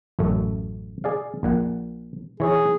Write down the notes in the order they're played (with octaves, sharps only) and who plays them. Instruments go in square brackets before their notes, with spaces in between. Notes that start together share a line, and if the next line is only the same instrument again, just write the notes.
[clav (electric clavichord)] A1 F#2 A3
G#4 D5 F5
A#1 A#2 F#5
[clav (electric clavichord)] E3 C#5 E5 [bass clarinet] G#4